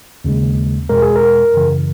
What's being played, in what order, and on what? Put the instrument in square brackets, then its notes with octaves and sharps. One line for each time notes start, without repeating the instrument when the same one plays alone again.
[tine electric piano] D#2 C#3 G#3
E2 B2 G#3 A#4
G#4
A#4
F#2 C#3 E3